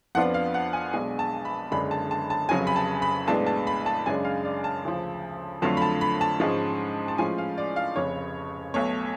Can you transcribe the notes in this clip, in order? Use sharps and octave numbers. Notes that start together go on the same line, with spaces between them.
F2 F3 B3 D4 F4 F#5
F5
F#5
G#5
B1 B2 G#3 D4 G#5
A5
B5
F#1 F#2 D3 G#3 D4 B5
A5
A5
A5
F1 F2 C#3 F#3 G#5
B5
A5
B5
B1 A2 G#3 B3 D4 A5
A5
B5
A5
F#2 C#3 G#3 D4 G#5
F5
D5
A5
D2 C#3 F3
F2 D3 F#3 A3 F4 A5
B5
A5
B5
A5
G#2 F3 G#3 C#4
A5
A2 F3 G#3 C#4 F4 G#5
F5
D5
F5
F1 F2 C#3 C#5
B1 B2 A3 C#5